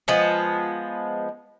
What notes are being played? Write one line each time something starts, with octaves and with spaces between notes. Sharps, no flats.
F3 G#3 B3